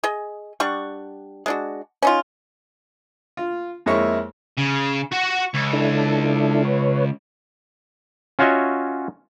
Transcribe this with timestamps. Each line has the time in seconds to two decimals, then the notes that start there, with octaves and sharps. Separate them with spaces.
0.04 G#4 D#5
0.60 G3 D4 F#5 C#6
1.46 G#3 D4 F#4
2.02 C#4 D#4 F4
3.37 F4
3.86 F2 G#3 A#3 E4 C#5 C#6
4.57 C#3
5.12 F#4 F#5 C#6
5.54 C#2
5.73 D4 E4 A4
6.65 B4 C#5
8.39 C#4 F4 F#4 C#5 D#5 E5